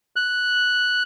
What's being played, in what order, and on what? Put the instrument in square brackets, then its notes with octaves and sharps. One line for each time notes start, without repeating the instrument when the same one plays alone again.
[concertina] F#6